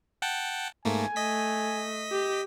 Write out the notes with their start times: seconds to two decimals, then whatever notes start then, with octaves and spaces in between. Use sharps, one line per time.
0.22 F#5 G5 A5
0.85 G#2 A3 A#3 G#5
1.16 A3 D#5 B6
2.12 G4